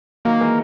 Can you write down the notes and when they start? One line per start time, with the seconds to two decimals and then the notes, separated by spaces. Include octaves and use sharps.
0.25 D#3 F#3 A#3
0.41 E3 G#3